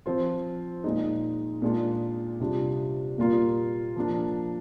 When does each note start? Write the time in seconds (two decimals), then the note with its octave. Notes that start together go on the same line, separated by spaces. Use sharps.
0.06 F3 C4 F4
0.84 A#2 G#3 D#4
1.62 A#2 G#3 D4 F4
2.40 C3 G3 D4 F4
3.18 A#2 G3 A#3 F4
3.96 F3 A#3 D4